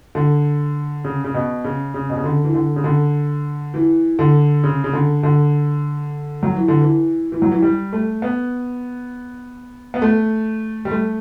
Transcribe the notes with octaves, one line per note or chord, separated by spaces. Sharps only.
D3
C#3
C#3
B2
C#3
C#3
B2
C#3
D3
E3
D3
C#3
D3
E3
D3
C#3
C#3
D3
D3
F#3
E3
D3
E3
E3
F#3
E3
G3
A3
B3
B3
A3
G3
A3